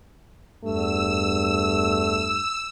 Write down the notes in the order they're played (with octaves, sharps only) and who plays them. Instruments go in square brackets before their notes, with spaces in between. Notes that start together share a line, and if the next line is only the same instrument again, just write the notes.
[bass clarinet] E2 [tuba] G2 [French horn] A3 [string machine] E6